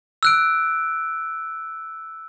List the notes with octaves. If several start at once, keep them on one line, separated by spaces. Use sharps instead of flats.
E6 F#6 D7